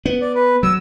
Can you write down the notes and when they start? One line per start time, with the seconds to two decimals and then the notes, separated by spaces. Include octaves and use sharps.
0.06 B3
0.21 D5
0.35 B4
0.63 F#3 E6